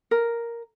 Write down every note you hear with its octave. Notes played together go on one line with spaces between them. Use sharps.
A#4